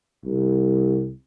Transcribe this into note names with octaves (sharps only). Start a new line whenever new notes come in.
C2